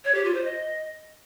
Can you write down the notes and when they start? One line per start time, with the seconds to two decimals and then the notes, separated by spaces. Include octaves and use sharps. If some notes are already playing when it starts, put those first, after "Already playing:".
0.05 C#5
0.15 G4
0.25 F4
0.34 C5
0.44 D#5